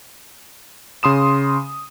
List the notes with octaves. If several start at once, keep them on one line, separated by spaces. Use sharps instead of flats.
C#3 C6 D#6 E7